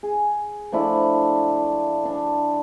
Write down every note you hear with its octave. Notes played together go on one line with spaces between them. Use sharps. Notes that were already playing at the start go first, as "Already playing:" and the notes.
G#4
F3 A3 D4 E4
D4